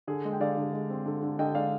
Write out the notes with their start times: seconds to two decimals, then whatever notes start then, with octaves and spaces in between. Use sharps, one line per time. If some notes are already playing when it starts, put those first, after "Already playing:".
0.07 D3 G#4
0.25 G#3
0.33 G5
0.40 D3 D5 F5
0.57 D3
0.73 G#3
0.90 C4
1.06 D3
1.22 D3
1.39 D3 D#5 G5
1.55 G#3 D5 F5